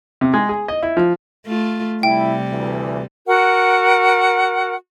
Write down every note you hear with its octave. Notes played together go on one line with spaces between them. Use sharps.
C3
G#3
G#4
D#5
E4
F3
A3 F4
C3 G3 E4 G5
D2 E3
F#4 A#4 F#5